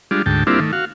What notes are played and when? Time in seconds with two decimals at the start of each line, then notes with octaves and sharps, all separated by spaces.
0.11 G3 G#3 D4 F4
0.26 D2 G#2 G5 A5
0.47 G3 A#3 C4 D4 E4 F4
0.60 D#3 A3
0.73 F#4 F5